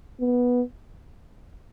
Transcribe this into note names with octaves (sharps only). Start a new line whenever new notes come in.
B3